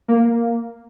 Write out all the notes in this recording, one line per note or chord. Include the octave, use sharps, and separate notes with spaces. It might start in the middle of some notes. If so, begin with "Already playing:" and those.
A#3